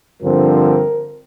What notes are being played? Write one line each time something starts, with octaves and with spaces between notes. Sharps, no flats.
G2 D3 F3 C4 A#4